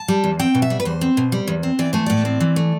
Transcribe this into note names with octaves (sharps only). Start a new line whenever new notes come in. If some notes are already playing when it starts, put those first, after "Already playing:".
Already playing: A5
G3
E2
C4 G5
B2
E5
G3
B4
E2 C5
C4
B2
G3
E2
C4
E3 D5
A3 C5
A2 D5
C4
E3
A3